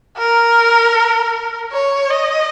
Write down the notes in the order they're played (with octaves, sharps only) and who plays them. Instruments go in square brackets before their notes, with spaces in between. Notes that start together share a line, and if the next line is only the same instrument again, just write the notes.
[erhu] A#4
C#5
D#5